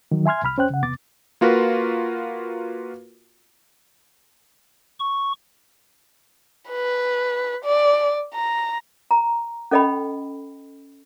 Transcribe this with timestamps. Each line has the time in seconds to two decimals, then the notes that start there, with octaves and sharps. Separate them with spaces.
0.11 D#3 F#3
0.26 E5 G#5 C6 F6 G#6
0.43 C2 B5 F6
0.57 F2 C#4 C5 G5 F#6
0.70 C#3 F#5
0.83 E2 C3 B3 D6 A6
1.41 A#3 F4 F#4 A#4 B4
5.00 C#6
6.70 B4
7.65 D5
8.34 A#5
9.11 A#5
9.71 C#4 A4 D#5 G5 B5